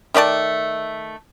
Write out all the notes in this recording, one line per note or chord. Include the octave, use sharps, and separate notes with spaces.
D#3 A3 D5 A5